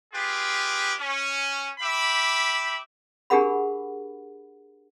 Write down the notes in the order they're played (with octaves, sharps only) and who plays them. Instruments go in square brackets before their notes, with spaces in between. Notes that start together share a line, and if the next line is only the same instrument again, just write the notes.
[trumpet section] F4 G4 G#4 B4
C#4
G4 E5 B5 D6
[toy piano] D4 G4 G#4 A#4 F#5 B5